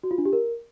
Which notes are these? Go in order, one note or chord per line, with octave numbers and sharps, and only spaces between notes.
F#4
F4
D4
G4
A#4